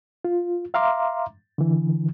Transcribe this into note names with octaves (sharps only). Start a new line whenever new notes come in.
F4
E5 F5 A#5 C6 D6
D3 E3